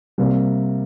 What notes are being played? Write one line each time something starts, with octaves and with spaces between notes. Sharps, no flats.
C3 G3 A#3